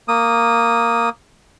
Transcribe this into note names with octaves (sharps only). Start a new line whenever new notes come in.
A#3 D#6